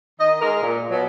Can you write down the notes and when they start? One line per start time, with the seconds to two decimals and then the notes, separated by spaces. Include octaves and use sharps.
0.20 D#3 D#5
0.42 G#3 A#4
0.62 A#2
0.91 B2 F#3